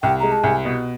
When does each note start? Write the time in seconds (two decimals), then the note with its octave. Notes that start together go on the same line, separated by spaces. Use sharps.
0.03 C2 G5
0.20 G#3 A#5
0.32 A5
0.43 C2 G#5
0.65 B2